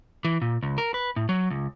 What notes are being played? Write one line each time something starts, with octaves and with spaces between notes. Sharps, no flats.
E3
A#2
C#2
A#4
B4
A2
F#3
C#2